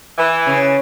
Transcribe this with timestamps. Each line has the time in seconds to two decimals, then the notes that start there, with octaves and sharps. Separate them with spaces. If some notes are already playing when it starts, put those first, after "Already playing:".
0.17 E3
0.46 C#3